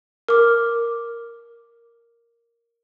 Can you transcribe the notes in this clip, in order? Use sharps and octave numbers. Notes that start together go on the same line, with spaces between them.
A#4 D6